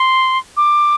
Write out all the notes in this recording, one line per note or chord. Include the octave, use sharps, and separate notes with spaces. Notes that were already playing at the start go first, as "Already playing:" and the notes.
Already playing: C6
D6